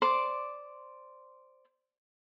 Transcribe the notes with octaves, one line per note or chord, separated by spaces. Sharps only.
C5 D5 D6